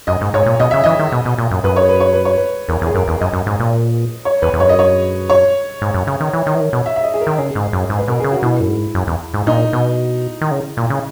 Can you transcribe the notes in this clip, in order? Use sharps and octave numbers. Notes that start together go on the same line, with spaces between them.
F#2 D#5
G#2
G#2 C#5
A#2
B2 D#5
C#3 E5
E3 D#5
D#3
B2
B2
A#2
F#2
F#2 B4
C#5
B4
C#5
B4
C#5
B4
E2 A#4
E2
G#4
F#2 A#4
E2
F#2 D#5
F#2
G#2
A#2
C#5
E2 B4
E2
F#2 C#5
D#5
C#5
C#5
G#2
F#2
C#3
D#3
E3
D#3
E3
D#3
B2
E5
E5
D#5
G#4
A#4
D#3
C#3 G#4
G#2
F#2
G#2
B4
B2 A#4
C#3 G#4
F#4
B2 E4
F#2
G#2
F#2
E2
G#2
A#2 D#4
B2
D#3
C#3
A#2
C#3